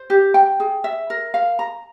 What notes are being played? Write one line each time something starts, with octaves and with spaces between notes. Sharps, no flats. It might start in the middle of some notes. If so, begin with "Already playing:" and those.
Already playing: C5
G4
G5
G#4
E5
A#4
F5
A#5